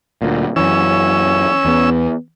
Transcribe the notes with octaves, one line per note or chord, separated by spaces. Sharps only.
D2 A#2
F#2 E3 C#4 E6
E2 B3